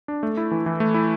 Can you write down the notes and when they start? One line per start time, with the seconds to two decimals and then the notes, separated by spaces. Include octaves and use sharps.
0.08 D4
0.23 A3
0.37 E4
0.51 E3
0.66 E3
0.80 A3
0.94 E4